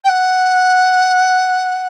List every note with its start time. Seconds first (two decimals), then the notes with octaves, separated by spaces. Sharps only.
0.04 G5
0.08 F#5